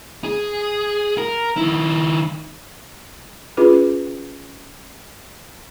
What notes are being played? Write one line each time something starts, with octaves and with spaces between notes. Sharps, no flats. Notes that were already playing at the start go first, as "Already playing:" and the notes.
G#4
A#4
D#3 E4
C#4 F4 G#4 B4